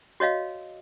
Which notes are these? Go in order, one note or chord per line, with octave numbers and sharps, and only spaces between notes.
F#4 C#5 D#5 F5